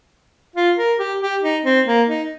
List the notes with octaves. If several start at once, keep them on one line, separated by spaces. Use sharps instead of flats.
F4
A#4
G4
G4
D#4
C4
A#3
D#4